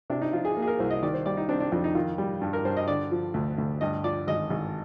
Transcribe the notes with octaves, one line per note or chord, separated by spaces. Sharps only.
C3 D4
D#4
F3 F4
G#4
A#3
G#4
A#4
C2 C5
D#5
D#3 D5
C5
G3 D5
D#4
C4 D4
D4
F2 D4
D#4
D#3 F4
G3
G2
A#4
G2 C5
D#5
D3 D5
F3
D2
D2
G2 D#5
F3 D5
G#1 D#5
G#1